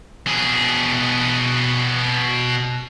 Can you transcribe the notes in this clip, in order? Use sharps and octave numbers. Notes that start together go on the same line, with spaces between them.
B2 G#4